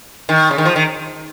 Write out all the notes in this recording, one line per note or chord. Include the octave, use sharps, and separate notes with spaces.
D#3
C#3
D#3
F3
D#3